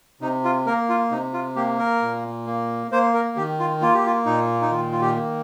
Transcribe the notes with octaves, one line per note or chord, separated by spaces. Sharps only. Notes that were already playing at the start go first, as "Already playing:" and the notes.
C3 D#4
F4
A#3 A#4
F4
C3 D#4
F4
A#3 G4
A#4
A#2
A#3
A#3 C5
A#4
D#3 G4
F4
A#3 F4
G4
F4
A#2 D#4
D#4
D#3 F4
F4
G4
A#3